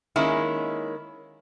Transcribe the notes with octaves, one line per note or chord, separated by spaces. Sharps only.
D#3 G#3 A#3 C#4 E4